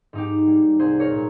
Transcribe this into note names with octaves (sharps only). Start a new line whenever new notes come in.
G#2 D#4 G4
G3 A#3
C2 G#4 C5
A#4 C#5
A#2 G#3